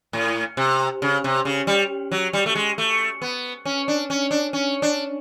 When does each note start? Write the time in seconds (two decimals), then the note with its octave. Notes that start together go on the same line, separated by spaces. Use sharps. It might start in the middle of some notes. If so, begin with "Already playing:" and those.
0.13 A2
0.57 C3
1.02 C#3
1.24 C3
1.45 C#3
1.67 G3
2.12 F#3
2.33 G3
2.46 A3
2.55 G#3
2.78 A3
3.22 B3
3.65 C#4
3.88 D4
4.10 C#4
4.31 D4
4.53 C#4
4.82 D4